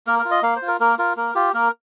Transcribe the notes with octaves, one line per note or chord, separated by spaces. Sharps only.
A#3 A#4
A#4
F4
D#5
A#3 F5
C5
F4
A#4
A#3 A#4
F4 A#4
A#3 A#4
F4 G4
A#3 A#4